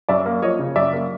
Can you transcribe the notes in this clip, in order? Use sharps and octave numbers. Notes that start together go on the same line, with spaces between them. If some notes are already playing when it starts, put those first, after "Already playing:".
F#2 D5 E5
A#3
F3 C#5 D#5
C#3
F#2 D5 E5
A#3